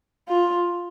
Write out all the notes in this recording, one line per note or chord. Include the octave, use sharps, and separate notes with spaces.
F4